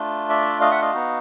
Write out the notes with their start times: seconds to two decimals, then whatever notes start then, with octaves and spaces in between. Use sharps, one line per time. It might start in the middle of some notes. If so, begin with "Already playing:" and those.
Already playing: A3 D4 F4
0.30 D5 E5
0.61 D#5 F5
0.71 E5 F#5
0.82 D#5 F5
0.93 B3 D#4 F#4